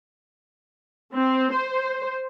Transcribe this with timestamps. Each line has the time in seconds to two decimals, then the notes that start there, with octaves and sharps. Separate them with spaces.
1.14 C4
1.52 C5